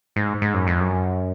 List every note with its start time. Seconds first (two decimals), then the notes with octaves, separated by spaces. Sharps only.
0.16 G#2
0.42 G#2
0.54 F#2
0.67 F2
0.80 F#2